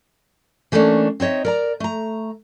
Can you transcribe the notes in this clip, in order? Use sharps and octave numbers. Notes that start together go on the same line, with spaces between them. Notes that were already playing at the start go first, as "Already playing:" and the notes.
E3 A3 A#3 C#4 D4
C4 D#4 C#5 D#5 E5
A#4 D5 A#5
A3 A#5